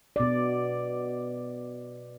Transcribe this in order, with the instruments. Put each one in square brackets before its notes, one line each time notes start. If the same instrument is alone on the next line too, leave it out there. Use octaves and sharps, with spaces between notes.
[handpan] B2 D5